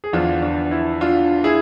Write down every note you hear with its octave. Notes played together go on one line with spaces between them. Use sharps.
G#4
E2 D3 F3 D4 F4
D4
E4
D4 F4
E4 G#4